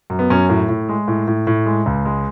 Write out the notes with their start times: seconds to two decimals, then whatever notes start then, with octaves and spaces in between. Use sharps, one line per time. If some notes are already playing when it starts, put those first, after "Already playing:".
0.10 F#2
0.19 B3
0.30 F#2 C#4
0.49 A2
0.69 A2
0.89 G#3
1.08 A2
1.28 A2
1.47 A2
1.66 G#3
1.86 C#2
2.05 G#3